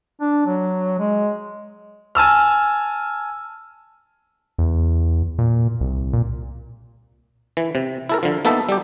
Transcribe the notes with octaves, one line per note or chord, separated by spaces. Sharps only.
D4
F#3
G#3
G#5 A5 E6 F6
E2
A#2
C2
A#2
E3
C3
E4 A4 A#4
D3 F3
A#3 B3 D#4 A4 E5 A5
G3 G4